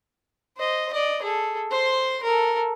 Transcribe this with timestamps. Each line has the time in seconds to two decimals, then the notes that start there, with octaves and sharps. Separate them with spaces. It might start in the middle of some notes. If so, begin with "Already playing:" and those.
0.57 C5 D#5
0.93 D5 D#5
1.22 G#4 A4
1.71 C5 C6
2.23 A4 A#4